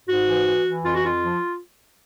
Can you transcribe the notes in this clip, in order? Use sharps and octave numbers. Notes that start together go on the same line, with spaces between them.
G#2 F#4
E3
E3
E3
F2 F4
F#4
F2 F4
F3